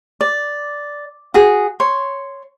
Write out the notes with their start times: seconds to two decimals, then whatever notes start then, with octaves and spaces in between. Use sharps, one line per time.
0.21 D5
1.34 F#4 G#4
1.80 C#5 C6